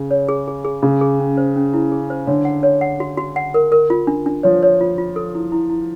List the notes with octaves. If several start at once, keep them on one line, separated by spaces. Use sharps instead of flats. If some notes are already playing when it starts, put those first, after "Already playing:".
Already playing: C#3
C#5
G#4
G#4
G#4
C#3 G#4
G#4
C#4
C5
C#4
E4
G#4
C5
D3 C#5
F#5
C#5
F#5
F#4
F#4
F#5
A#4
A#4
F4
D4
D4
F3 C#5
C#5
F4
F4
A4
E4
E4
E4